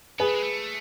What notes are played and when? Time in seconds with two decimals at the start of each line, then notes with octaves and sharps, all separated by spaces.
0.19 B3 G#4 B4
0.27 A3
0.35 G#3
0.43 A3